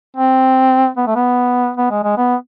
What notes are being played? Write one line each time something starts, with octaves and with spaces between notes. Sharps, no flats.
C4
B3
A3
B3
B3
G#3
G#3
B3